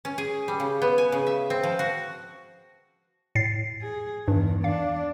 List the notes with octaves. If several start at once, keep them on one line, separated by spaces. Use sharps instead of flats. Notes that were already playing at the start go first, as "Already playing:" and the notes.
C#4
G#4
G3
C#3
B3
G#5
C#3
E5
C4
F3
F#4
A2 A6 C7
G#4
E2 G2 D#3
D4 F5